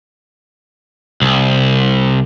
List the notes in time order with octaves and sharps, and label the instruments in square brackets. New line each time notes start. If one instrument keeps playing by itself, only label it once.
[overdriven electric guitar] C2